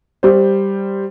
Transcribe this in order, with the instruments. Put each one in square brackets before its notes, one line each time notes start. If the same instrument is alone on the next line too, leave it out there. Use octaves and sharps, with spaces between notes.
[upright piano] G3 C5